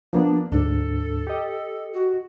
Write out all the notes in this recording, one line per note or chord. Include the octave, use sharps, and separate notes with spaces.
F3 A#3 B3 D4
D2 G#2 D4 A4
G4 D#5
F#4